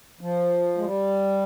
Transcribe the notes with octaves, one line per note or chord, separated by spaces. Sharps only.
F3
G#3
G3